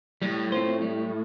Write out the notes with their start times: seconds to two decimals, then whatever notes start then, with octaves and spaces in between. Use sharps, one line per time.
0.22 A2 G3
0.52 C4 F4 C5
0.82 G3